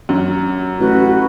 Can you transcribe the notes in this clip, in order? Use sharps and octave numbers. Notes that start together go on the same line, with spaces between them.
F#2
A1 F#4 B4